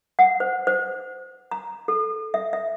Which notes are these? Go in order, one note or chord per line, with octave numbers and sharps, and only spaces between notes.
F#5
C5
C5
A#5
A4
E5
E5